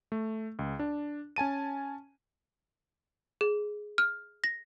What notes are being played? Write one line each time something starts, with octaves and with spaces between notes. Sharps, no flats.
A3
C#2
D4
C#4 G#5 A5 D#7
G#4
F6
A#6